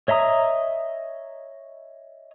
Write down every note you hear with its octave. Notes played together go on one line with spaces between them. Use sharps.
C#5 D#5 E5 A#5 D#6